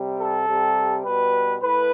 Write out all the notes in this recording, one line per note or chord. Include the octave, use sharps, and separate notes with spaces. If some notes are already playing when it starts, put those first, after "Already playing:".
Already playing: C3 G3
A4
C3 G3
B2 G3 B4
A2 B4